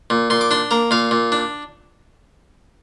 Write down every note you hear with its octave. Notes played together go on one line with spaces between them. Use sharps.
A#2
A#2 C6
D6
D4 C6
A#3 A#5
A#2 F5
A#2
D4